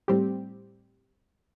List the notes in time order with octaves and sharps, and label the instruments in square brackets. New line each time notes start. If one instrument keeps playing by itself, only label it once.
[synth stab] A2 G3 C4 G4